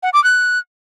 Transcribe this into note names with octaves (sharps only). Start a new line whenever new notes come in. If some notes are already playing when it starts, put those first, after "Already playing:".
F#5
D6
F#6